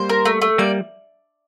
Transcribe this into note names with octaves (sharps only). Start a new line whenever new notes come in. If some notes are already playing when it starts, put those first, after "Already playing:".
Already playing: G3 A#3 C5
A#4
A3
A3
G3 A#3 D5